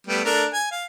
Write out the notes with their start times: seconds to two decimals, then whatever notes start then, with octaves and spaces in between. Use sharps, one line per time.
0.07 G3 A3 B3
0.25 A3 D4 A#4
0.53 G#5
0.71 F5